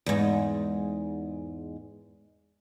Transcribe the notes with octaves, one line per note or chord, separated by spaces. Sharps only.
E2 G#2